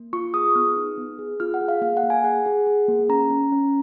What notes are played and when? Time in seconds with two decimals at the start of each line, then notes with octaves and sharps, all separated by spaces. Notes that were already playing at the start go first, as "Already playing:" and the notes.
Already playing: A#3
0.13 F4 C#6
0.34 G#4 D#6
0.55 B3 F6
0.76 D#4
0.98 B3
1.19 G#4
1.40 F4 F6
1.54 F#5
1.61 G#4
1.68 F5
1.82 A#3 F5
1.97 F#5
2.03 A#3
2.10 G#5
2.24 G#4 F#5
2.46 G#4
2.67 G#4
2.88 A#3
3.09 C#4 A#5
3.30 C#4
3.52 C#4